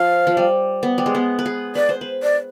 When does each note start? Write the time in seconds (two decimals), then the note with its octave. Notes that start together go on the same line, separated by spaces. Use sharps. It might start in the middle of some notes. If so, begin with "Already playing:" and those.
Already playing: F3 F5
0.27 F3
0.37 G3
0.83 B3
0.98 G3
1.06 G#3
1.15 B3
1.39 B4
1.46 G#4
1.75 B4 D5
1.89 C5
2.01 B4
2.23 D5